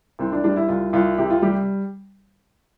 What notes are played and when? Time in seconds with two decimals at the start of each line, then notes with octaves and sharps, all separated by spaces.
0.19 C2 C4
0.32 D4
0.44 G3 D4
0.56 E4
0.69 C2 F4
0.93 C2 F4
1.18 C3 G4
1.30 F4
1.42 G3 G4